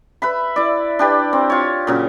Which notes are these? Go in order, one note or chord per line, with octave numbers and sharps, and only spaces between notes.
B4 E5 B5
E4 D5
D4 G4 B4
C4
F4 C#5
A#2 C#3 F#3